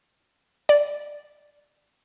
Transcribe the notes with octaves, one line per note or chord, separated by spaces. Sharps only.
D5